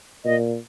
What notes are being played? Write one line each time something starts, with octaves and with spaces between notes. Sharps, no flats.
A#2 D#5